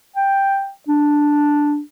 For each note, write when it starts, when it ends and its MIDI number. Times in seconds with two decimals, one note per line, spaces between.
0.16 0.70 79
0.88 1.80 62